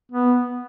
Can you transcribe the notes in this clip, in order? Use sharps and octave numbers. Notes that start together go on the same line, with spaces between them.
B3